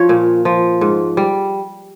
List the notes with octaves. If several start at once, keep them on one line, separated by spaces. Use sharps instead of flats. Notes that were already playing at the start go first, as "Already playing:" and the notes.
Already playing: F3 C#5
A#2
F3
G#2
G3